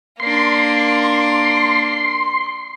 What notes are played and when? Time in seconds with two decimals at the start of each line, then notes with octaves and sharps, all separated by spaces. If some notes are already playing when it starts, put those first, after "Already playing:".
0.20 A#3 D4 C6